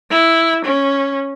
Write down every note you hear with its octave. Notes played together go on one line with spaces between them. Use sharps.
E4
C#4